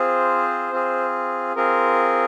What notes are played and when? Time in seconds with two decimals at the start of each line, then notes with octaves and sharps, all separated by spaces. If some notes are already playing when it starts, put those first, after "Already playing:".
Already playing: C4 F4 G#4 C5
0.72 C4 F4 G#4
1.56 C4 F4 G#4 A#4